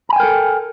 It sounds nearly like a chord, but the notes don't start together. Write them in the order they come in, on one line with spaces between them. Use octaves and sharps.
A#5 G#5 G5 A#4 A4